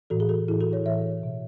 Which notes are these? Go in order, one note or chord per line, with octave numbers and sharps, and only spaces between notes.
A2 E3 F#4 A4
G#4
F#4 A4
A2 E3 E4 G#4
F#4 A4
A4 C#5
A2 E3 C#5 E5
B2